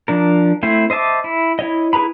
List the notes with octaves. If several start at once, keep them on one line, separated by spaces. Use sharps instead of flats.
F3 D4 A#4
A3 C4 E4 C5
C5 D#5 E5 A5 D6
E4
E4 C#5 D#5
E4 G#4 B4 A#5 B5